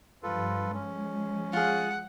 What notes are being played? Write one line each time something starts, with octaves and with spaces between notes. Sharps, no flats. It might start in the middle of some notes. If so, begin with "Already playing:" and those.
G2 F3 F4 A4 B4
F3 G#3 C#4
F4 G#4 F#5